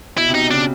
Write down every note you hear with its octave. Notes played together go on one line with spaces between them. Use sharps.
B2 E4
C3
B2 D#4
C#3 D4